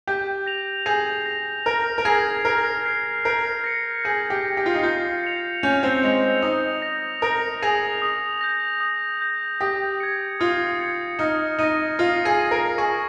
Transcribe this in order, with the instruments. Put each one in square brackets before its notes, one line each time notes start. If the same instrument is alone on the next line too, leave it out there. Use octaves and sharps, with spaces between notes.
[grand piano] G4 [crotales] G6
[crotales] A#6 F7
[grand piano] G#4 [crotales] G6
[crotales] A#6
F7
[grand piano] A#4 [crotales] F6
[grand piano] A#4
[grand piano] G#4 [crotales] G#6 C7
[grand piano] A#4 [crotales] F6
[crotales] G#6 C7
[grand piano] A#4 [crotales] G6
[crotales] A#6 C#7
[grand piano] G#4 [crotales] G6
[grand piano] G4
[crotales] A#6 C#7
[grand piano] G4
F4
D#4
[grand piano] F4 [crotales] G6
[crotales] C#7 F7
[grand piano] C#4 [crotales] G6
[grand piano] C4
[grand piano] G#3 [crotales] C#7 F7
[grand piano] D#4 [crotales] D#6
[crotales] A#6 F7
[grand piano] A#4 [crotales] D#6
[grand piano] G#4 [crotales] A#6 F7
[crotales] D#6
G6 A#6
D#6
G6 A#6
[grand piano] G4 [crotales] D#6
[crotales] G#6 C#7
[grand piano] F4 [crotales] D#6
[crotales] G#6 C#7
[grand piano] D#4 [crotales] F6
[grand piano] D#4 [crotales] A#6 D#7
[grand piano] F4 [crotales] F6
[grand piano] G#4
[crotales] A#6 D#7
[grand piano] A#4
[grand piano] G#4 [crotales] C#6